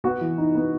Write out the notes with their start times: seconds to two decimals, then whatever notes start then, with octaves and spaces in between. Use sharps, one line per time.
0.04 B3 F#4
0.21 E3
0.38 D#4
0.55 B3